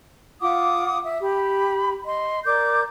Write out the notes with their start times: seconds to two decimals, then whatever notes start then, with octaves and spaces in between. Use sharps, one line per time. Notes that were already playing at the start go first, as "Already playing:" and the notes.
0.41 F4 F#5 D6 D#6
1.03 E5
1.22 G4 B5
2.06 D#5 C6
2.45 A#4 D5 D6 G6